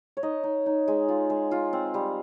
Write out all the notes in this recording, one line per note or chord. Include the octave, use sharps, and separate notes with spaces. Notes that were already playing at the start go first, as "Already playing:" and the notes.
C#5
D#4 D#5
D#4
D#4
G#3
F4
G#3
F4
C4
G3